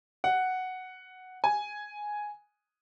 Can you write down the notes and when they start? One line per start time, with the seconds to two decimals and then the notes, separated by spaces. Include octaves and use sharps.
0.24 F#5
1.44 G#5